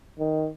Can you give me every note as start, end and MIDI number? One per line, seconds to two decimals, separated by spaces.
0.19 0.48 51